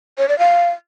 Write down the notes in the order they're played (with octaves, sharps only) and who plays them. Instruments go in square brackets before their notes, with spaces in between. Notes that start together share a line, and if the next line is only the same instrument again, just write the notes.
[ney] C#5
D5
F5